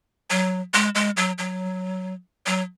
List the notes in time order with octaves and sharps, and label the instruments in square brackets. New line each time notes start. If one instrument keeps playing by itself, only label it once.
[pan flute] F#3
G#3
G#3
F#3
F#3
F#3